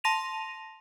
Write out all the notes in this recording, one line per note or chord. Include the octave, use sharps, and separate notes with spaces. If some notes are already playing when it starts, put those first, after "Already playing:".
A5 C6 A#6 D#7 F7